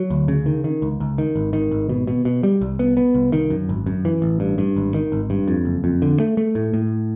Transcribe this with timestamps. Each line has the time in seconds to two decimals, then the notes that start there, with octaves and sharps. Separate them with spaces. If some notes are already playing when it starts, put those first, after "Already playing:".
Already playing: F#3
0.10 D2
0.28 C#3
0.46 D#3
0.64 D#3
0.82 C#2
1.00 C#2
1.18 D#3
1.36 G#1
1.53 D#3
1.71 G#1
1.89 B2
2.07 B2
2.25 B2
2.43 G3
2.61 C2
2.79 B3
2.97 B3
3.14 C2
3.32 D#3
3.50 F#2
3.69 G#1
3.86 F#2
4.05 E3
4.22 A1
4.40 G2
4.58 G2
4.76 G#1
4.94 D#3
5.12 G#1
5.30 G2
5.48 F2
5.65 F#1
5.84 F2
6.02 D3
6.20 A3
6.37 A3
6.55 A2
6.74 A2